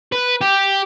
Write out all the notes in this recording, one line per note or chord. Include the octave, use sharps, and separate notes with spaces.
B4
G4